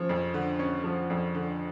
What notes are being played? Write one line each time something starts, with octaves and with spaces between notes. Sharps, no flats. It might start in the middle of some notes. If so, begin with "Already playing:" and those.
Already playing: F3 C#4
F2
D3
C#4
F3
F2
D3